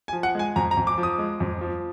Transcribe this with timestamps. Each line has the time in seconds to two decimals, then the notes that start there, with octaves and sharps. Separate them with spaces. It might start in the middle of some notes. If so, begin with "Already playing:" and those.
0.08 G#5
0.13 F3
0.23 F#5
0.35 G#3 G#5
0.56 F2 A#5
0.71 A#5
0.77 F2
0.87 D6
0.98 F3
1.03 D#6
1.18 G#3
1.40 F2
1.61 F3